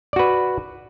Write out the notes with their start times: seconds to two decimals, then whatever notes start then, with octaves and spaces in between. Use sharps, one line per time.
0.13 D5
0.16 F#4
0.19 B4